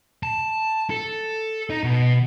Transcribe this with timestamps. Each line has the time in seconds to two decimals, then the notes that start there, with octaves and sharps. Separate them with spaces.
0.23 A5
0.90 A4
1.70 D#4
1.83 B2